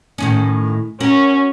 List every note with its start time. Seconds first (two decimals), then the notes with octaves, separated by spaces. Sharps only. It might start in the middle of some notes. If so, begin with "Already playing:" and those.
0.18 A2 D#3 C#4
1.00 C#4 F#4 A#4